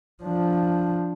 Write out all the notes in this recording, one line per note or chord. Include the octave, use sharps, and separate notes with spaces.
F3 D4